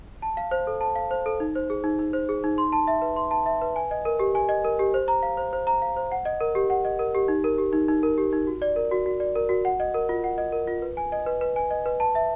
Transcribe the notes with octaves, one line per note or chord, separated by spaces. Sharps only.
A5
F5
C5
A4
A5
F5
C5
A4
D#4
C5
G#4
D#4
D#4
C5
G#4
D#4
C6
A5
E5
B4
C6
A5
E5
B4
G#5
D#5
A#4
G4
G#5
D#5
A#4
G4
C5
A#5
F5
C5
C5
A#5
F5
C5
F#5
D#5
A#4
G4
F#5
D#5
A#4
G4
D#4
A#4
G4
D#4
D#4
A#4
G4
D#4
F#4
D5
A#4
F#4
F#4
D5
A#4
F#4
F#5
D#5
A#4
F4
F#5
D#5
A#4
F4
B4
G#5
D#5
B4
B4
G#5
D#5
B4
A5
E5